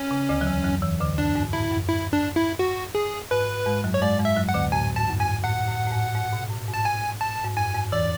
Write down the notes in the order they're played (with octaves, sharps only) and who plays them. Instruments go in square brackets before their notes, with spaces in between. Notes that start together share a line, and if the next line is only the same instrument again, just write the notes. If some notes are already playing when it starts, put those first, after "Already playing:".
Already playing: [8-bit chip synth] C#4
[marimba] C#3
D2 D3
F#3
E2 E3
F#2 F#3
E2 E3
D2 D3
[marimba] F#2 [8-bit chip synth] D4
[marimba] G#2
[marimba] A2 [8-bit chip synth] E4
[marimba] F#2
[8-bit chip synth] E4
D4
E4
F#4
G#4
[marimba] G#2 [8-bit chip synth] B4
[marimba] G#2 G#3
F#2 F#3
[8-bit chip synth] C#5
[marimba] G#2 G#3 [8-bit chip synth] D5
[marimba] G#2 G#3
[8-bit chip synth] E5
[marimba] F#2 F#3
[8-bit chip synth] F#5
[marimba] D2 D3
[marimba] A2 [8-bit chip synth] G#5
[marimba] G#2 [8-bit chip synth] A5
[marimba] F#2
[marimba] G#2 [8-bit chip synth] G#5
[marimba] A2 [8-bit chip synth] F#5
[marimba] A2
A2
G#2
G#2
B2
A2
G#2
[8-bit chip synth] A5
G#5
A5
[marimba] G#2
[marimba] F#2 [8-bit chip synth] G#5
[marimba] G#2
[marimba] E2 E3 [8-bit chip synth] D5